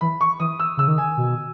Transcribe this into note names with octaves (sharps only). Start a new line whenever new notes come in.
E3 B5
C#6
E3 D#6
E6
C#3 E6
D#3
G#5
B2